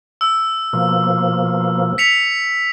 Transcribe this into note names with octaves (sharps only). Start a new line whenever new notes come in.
E6
B2 F3 A#3
B6 C#7 F7